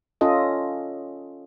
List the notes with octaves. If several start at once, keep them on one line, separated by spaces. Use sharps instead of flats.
C#4 F4 A4 D#5